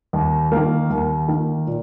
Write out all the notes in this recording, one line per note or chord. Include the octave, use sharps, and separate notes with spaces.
D#2
D#3 A#3
D#2
D#3 A#3
A#2